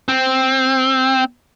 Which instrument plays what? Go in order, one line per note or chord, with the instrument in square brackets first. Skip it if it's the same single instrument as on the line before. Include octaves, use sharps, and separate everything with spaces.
[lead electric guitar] C4